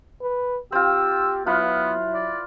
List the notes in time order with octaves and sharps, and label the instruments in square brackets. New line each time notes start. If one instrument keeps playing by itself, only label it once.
[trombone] B4
[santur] C4 F4 [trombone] G4 [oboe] E6
[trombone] F#3 [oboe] B3 [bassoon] E4 [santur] F4 B4 B5
[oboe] D5